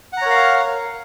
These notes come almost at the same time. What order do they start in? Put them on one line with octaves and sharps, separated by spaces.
F#5 A#5 C#5 A#4 F5